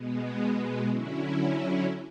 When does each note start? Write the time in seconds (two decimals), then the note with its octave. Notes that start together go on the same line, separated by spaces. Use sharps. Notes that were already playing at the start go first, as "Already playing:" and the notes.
Already playing: B2 G#3 B3
0.88 D3 F#3 C#4 E4